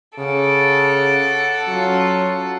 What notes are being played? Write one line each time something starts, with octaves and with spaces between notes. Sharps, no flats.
C#3 A4 F#5 D6
F#3 C#4 F4